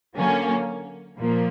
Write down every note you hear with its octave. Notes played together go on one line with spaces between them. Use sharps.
D3 F#3 A#3 C#4
A#2 F3 A#3